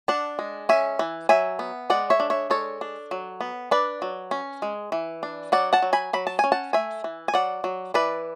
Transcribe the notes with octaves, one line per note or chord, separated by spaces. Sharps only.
D4 F#5 A5
G#3
C#4 E5 G#5
E3
F#3 E5 G#5
B3
G#3 D5 F#5
C#5 E5
D4
C#5 E5
G#3 A4 C#5
D4
F#3
B3
D4 B4 D5
F#3
C#4
G#3
E3
D4
F#3 D5 F#5
F#5 A5
F#3
G#5 B5
F#3 B5
A5
C#4 G#5
F#5 A5
A3 E5 G#5
E3
G#5
F#3 D5 F#5
F#3
E3 B4 D5